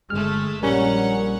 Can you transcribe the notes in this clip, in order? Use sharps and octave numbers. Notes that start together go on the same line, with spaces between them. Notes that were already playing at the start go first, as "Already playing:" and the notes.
G1 G#3 A3 F6
A#1 G3 C#4 A#4 C#5 F#5